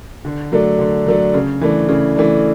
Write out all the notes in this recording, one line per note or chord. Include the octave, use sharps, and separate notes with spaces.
D3
F#3 A3 D4
D3
F#3 A3 D4
C#3
E3 A3 D4
C#3
E3 A3 D4